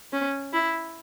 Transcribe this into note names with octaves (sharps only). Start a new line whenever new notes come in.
C#4
E4